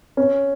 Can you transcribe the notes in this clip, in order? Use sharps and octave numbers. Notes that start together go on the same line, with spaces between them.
C#4